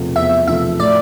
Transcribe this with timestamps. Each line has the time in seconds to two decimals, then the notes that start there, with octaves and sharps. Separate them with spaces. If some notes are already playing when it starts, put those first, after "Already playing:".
Already playing: E2 C3 F3 A3
0.16 E2 E5
0.48 C3 F3 A3 E5
0.79 A2 D5